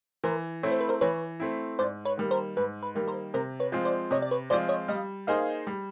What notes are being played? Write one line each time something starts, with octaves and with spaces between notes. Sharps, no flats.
E3 A#4 C5
A3 C4 E4 C#5
C5
B4
A#4 C5
E3 B4 C#5
A3 C4 E4
G#2 C5 D5
B4 C#5
D#3 G3 A#3
A#4 C5
G#2 B4
B4
D#3 G3 A#3
A#4 C5
C3 A#4 C5
B4 C#5
F3 G#3 C4 F4
C5 D5
C3 C#5 D#5
D5
B4 C#5
F3 G#3 C4 F4 C5 D5
C#5 D#5
G3 D#5 F5
A#3 D#4 G#4 C5 D#5 F5
G3